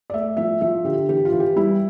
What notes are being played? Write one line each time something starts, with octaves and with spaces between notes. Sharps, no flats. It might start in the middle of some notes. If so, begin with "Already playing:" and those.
D5
A3 E5
F3 E5
F3 E5
D3 G4
E3 G4
F4
E3
G4
G3 E4